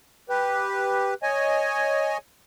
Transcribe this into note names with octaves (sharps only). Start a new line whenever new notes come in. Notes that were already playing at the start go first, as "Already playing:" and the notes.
G4 B4
C#5 D#5 G#5